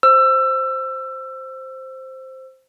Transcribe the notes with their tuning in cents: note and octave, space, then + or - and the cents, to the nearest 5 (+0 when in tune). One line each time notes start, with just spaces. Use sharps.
C5 +0 E6 +25